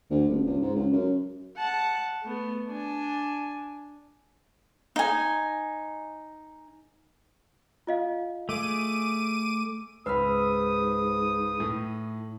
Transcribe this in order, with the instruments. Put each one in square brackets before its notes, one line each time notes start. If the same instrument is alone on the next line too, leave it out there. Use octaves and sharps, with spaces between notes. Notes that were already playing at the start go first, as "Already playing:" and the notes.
[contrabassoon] D2
D#1
C#2
G#2
C#2
F#2
[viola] F#5 A5
A3 B3
D4 G#5
[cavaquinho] D#4 G#5
[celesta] F4 D#5 F5
[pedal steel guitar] A3 G#4 [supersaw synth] D6 D#7
[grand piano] C#2 E6 [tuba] G#2 [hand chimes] B4 B5 [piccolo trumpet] D#6
[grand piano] A2